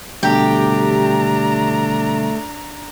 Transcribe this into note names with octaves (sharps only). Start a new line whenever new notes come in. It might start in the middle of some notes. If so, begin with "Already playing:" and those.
B2 D3 G3 A3 D4 G4 A#5